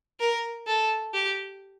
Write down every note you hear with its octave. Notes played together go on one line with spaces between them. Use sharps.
A#4
A4
G4